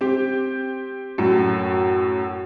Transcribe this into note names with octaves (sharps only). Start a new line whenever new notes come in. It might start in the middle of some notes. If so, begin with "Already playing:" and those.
C4 G4
F#2 A2